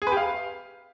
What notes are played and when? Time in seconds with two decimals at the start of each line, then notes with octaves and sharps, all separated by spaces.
0.02 G#4
0.07 B4
0.12 G4
0.17 F5